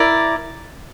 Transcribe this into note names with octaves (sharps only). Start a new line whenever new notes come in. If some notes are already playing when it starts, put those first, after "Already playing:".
Already playing: E4 A#4 D5